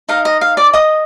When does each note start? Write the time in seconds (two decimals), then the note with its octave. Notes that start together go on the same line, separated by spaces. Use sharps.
0.09 D#4 A#4 D#5 F5
0.25 D#5
0.41 F5
0.57 D5 D6
0.73 D#5 D#6